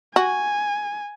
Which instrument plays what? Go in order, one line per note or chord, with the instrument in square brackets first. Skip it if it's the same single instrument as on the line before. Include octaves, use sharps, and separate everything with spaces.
[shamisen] F#4 [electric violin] G#5